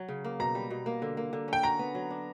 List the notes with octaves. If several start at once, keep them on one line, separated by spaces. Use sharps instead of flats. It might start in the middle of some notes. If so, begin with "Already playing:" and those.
Already playing: F#3
C#3
A#3
B2 A#5
G3
B2
A#3
D3
A#3
D3
C#4 G5
F#4 A#5
B3
F#3
D4